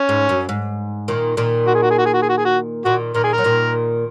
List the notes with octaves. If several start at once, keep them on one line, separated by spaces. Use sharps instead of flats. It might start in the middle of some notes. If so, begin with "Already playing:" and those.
Already playing: C#4
G#2
F#2
G#2
A#2 D#3
A#2 D#3
F#4
G#4
F#4
G#4
F#4
G#4
F#4
G#4
F#4
G#4
F#4
A#2 D#3 F#4
A#2 D#3 A#4
G#4
A#4
F#3
A#2 D#3